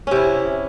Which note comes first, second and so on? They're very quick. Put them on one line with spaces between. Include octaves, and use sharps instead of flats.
C#4 C3 E4